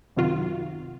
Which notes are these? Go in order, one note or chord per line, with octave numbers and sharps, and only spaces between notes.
F#2 C3 D#3 F4 F#4